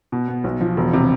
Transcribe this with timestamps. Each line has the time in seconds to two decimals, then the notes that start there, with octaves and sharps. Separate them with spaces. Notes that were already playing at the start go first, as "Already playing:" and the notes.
0.12 B2
0.28 B3
0.44 B1
0.61 F3
0.77 E1
0.93 C3